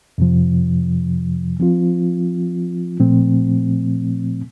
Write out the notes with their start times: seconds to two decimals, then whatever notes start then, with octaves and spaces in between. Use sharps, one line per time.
0.18 F2 C3 F3
1.60 F3 C4 F4
3.00 A#2 F3 A3 C4